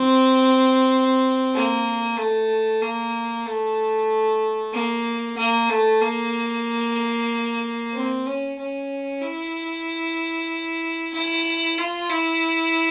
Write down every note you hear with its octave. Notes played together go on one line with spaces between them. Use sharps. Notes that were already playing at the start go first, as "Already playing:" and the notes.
Already playing: C4
A#3
A3
A#3
A3
A#3
A#3
A3
A#3
C4
C#4
C#4
E4
E4
F4
E4